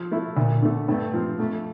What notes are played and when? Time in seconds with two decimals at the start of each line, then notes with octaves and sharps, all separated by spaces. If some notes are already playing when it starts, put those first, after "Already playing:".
Already playing: F3
0.11 A3 E4 A4
0.37 D2 A#2
0.62 D3 A3
0.88 G2 A3
1.13 F3 C4
1.39 F2 A3